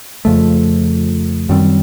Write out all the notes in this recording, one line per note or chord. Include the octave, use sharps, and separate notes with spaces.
F2 C#3 F3 A3
F#2 D#3 G3 C4